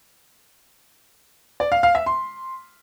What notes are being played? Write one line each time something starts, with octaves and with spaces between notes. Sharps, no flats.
D5
F5
F5
E5
C6